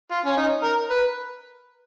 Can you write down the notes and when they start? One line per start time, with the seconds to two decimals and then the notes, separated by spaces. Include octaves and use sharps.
0.11 F4
0.25 C#4
0.37 D#4
0.64 A#4
0.90 B4